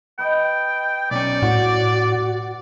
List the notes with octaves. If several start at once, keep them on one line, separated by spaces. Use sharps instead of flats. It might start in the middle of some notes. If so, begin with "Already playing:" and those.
B4 D#5 F#5 G5
B1 C#4 D5
A2 F#4